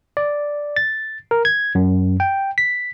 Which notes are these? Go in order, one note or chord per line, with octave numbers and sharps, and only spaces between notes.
D5
A6
A#4
G#6
F#2
G5
B6